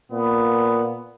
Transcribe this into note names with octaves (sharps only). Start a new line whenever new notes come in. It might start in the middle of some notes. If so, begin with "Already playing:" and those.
A#2 B3